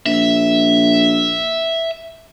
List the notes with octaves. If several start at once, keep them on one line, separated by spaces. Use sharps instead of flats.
A#1 E5